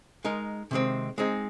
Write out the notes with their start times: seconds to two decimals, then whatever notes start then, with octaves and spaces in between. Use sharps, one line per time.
0.25 G#3 D#4 A#4
0.71 C3 D#3 G#3 C4
1.18 G#3 C4 D#4 G#4